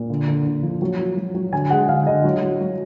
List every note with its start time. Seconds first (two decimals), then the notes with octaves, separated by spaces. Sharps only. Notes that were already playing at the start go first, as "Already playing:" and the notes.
Already playing: A#2
0.10 D3
0.28 D3
0.46 D3
0.63 F3
0.82 F#3
0.99 F#3
1.17 F#3
1.35 F#3
1.52 D3 G#5
1.70 G#3 F#5
1.88 D3 F5
2.07 D3 D#5
2.24 F#3
2.42 F#3
2.60 F#3